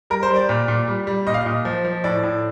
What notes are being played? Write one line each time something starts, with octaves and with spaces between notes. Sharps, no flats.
G3 A#4
C5
G3
D5
A#2
A#2
G3
G3
A#2 D#5
F5
A#2 D#5
F3
F3
A2 D5
A2